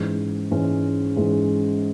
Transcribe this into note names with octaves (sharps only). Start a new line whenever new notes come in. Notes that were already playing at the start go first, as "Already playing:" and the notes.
Already playing: G#2 E3 G#3 C#4
G#2 E3 G#3 C#4
G#2 E3 G#3 C#4